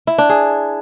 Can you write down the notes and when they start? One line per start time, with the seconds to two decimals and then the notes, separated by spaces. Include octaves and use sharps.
0.07 E4
0.18 D4
0.29 G#4